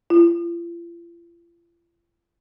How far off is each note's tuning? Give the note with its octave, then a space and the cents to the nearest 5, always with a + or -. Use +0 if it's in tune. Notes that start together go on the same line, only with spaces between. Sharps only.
F4 -40